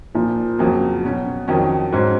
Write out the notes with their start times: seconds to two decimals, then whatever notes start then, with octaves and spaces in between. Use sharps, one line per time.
0.14 A#2 F3 A#3
0.59 F2 C#3 F#3 A#3
1.03 B2 F#3 C#4
1.48 F2 D#3 F#3 C#4
1.92 G#2 F#3 C#4